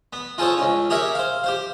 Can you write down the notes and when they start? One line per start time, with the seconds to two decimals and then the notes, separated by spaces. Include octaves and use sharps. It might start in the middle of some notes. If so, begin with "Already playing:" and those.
0.13 B3
0.38 F4 G#4 A4 C5 C#5
0.58 C#2 C#4
0.90 G4 G#4 A#4 C#5 E5
1.15 C5 F5
1.44 G4 C5 F5